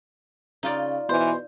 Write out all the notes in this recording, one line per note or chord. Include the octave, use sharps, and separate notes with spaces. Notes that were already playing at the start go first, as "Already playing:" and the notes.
C#3 D#4 F4 D5
B2 E3 C5